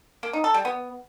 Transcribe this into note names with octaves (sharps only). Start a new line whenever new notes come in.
A#3
D#4
A4
G3
B3